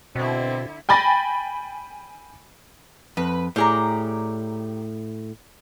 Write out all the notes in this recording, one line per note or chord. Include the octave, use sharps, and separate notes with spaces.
B2 D3 C4 E4
G5 G#5 B5 A6 A#6
F2 B4
A2 G4 G#4 D5 A#5